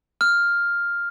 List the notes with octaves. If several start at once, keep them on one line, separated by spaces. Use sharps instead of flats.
F6